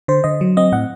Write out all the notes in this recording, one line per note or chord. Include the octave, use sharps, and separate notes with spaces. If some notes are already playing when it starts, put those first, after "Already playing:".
D3 C5
D3 D#5
F#3
C4 D#5
A2 F#5